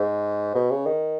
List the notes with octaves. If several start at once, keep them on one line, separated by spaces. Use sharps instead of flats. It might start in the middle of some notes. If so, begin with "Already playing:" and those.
Already playing: G#2
B2
C#3
D#3